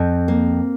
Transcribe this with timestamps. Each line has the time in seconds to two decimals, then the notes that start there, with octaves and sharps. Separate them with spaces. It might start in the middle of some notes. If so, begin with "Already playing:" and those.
Already playing: F2 C4
0.28 A#3